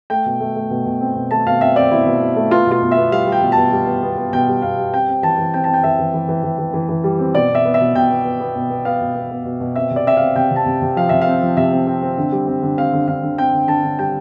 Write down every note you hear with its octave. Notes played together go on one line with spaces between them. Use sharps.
A3 G5
B2
A3
A3
B2
B2
C4
B2
A3 A5
B2 F5
C4 E5
C4 D5
B2 E4
B2
B2
A3
B3 F4
B2 F4
B2
E5
B3
G3 F5
G3
G5
B2
A5
B2
G3
B3
B3
B3
B2 G5
G3
B2 F5
G3
C4 G5
C4
E3 A5
E3
C4 G5
C4 A5
G5
E3 E5
E3
E3
E3
E3
E3
E3
E3
G3
C4
B2 D5
B2
E5
B3
E5
B2
B2 G5
B3
B3
B3
B2
B3
B3 F5
B2
B3
B3
B2
B2
C4 E5
C3
D5
C4 E5
C4 F5
C3 G5
C3
A5
C3
C3
F3 F5
C3 E5
F5
C4
F3
C3 E5
C4
C4
C4
D3
G3
C4
D3
C4 F5
D3
D3 F5
D3
C4 G5
D3
D3 A5
D3
G3 G5